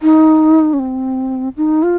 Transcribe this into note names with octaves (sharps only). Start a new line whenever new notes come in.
D#4
C#4
C4
D#4
F4